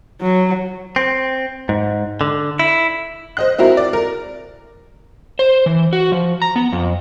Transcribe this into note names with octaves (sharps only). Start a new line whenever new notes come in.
F#3
C4
G#2
D3
E4
C5 D#5 F#6
C4 E4 F#4 A#4
D5
A#4
C5
E3
F#4
F3
A#5
B3
F2